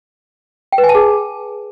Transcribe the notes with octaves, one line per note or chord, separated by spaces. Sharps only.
G5
B4
G#5
A5
G#4